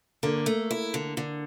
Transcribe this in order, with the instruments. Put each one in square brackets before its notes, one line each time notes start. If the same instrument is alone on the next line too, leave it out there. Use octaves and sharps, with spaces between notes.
[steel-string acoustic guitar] D3 [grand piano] A#3
[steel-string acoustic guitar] A3
E4
D3
D3